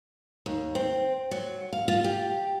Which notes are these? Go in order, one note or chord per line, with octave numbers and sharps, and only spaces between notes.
D#2
C4
F#3
F5
F4
G4